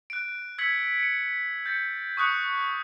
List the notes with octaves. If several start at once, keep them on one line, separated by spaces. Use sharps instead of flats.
F#6 D7
E6 G#6 B6 C#7 F#7
C#7 D7
G6 A6 C#7
C#6 D#6 F#6 C#7